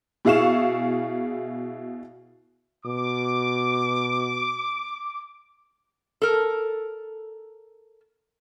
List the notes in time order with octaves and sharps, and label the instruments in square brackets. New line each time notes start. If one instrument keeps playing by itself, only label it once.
[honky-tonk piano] B2 E4 G#4 F5 C#6 E7
[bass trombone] B2 [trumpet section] D6
[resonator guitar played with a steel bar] A4 A#4